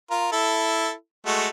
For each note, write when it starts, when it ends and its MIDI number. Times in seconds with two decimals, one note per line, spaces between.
0.11 0.31 65
0.11 0.31 70
0.32 0.92 64
0.32 0.92 69
1.26 1.48 56
1.26 1.48 57
1.26 1.48 66